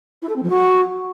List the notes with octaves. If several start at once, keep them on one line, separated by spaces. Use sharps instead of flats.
E4
A4
C4
F3
F#4